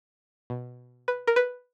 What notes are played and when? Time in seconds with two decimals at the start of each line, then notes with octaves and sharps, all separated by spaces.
0.50 B2
1.08 B4
1.27 A#4
1.36 B4